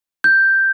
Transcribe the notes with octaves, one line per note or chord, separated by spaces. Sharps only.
G6